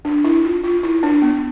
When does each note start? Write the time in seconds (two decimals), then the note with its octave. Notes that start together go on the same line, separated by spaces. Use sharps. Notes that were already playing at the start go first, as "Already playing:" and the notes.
0.05 D4
0.25 E4
0.45 F4
0.63 F4
0.83 E4
1.03 D4
1.22 B3